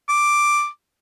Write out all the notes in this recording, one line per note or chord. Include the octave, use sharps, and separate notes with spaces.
D6